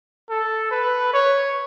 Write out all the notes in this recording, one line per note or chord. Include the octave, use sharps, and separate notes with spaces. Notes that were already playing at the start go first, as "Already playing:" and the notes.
A4
B4
C#5